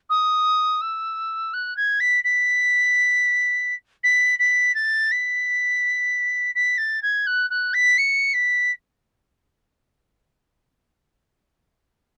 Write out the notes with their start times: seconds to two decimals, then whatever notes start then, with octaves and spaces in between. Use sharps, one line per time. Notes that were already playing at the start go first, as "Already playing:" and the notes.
0.09 D#6
0.81 E6
1.53 F#6
1.76 G#6
2.00 B6
2.24 B6
4.03 B6
4.39 B6
4.75 A6
5.11 B6
6.55 B6
6.78 A6
7.02 G#6
7.26 F#6
7.50 F#6
7.73 B6
7.98 C#7
8.34 B6